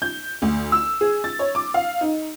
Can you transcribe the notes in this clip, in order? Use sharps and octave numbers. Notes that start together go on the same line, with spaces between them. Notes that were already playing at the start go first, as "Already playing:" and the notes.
G6
D2
E6
G#4
A6
C#5
D6
F5
D#4